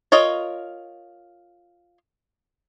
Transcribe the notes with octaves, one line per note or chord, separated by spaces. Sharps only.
F4 A#4 C#5 D#5